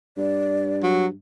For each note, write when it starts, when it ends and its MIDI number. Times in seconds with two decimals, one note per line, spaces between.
0.17 1.13 43
0.17 0.79 74
0.83 1.06 54